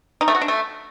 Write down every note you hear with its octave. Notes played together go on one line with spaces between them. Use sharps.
D#4
A3
F#4
D4
A3